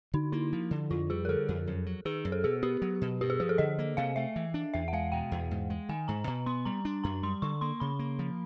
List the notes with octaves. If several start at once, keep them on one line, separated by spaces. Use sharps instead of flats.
D3 D#4
A#3 E4
F3
D3
F2 F4
G3 G#4
A#4
D3 A4
F2
F#2
F#3
D#3 G#4
F#2
A4
B2 G#4
B3 G4
F#3
B2
G2 G4
G#4
F3 G#4
A4
D3 D#5
A#3
C3 F5
A3 E5
E3
D4
E2 E5
F#5
G#3 F5
B2 G5
E2
G#2
G#3
D#3 G#5
G#2 A#5
B2 A#5
B3 C6
G3 A#5
D4
F#2 A#5
G3 C6
D3 C#6
A#3 C6
C#3 B5
A#3
F3